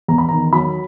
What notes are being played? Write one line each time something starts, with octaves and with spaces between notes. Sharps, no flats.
E2 A#5
B5
D#3 A#5
F#3 B5